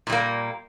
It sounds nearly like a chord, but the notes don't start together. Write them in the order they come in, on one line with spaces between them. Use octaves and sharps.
A#2 G3 A#3